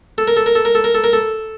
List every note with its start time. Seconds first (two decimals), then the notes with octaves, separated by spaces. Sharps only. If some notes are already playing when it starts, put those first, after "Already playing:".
0.18 A4
0.28 A#4
0.37 A4
0.46 A#4
0.55 A4
0.65 A#4
0.75 A4
0.84 A#4
0.95 A4
1.04 A#4
1.13 A4